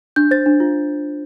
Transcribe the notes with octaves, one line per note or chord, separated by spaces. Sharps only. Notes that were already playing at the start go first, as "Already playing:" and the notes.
D4 G6
C5 A6
D4
F4